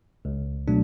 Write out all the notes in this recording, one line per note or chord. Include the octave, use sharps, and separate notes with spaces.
C#2
B2 F#3 A3 D4